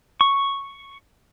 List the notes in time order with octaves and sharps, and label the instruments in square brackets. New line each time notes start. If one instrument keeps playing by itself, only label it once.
[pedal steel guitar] C#6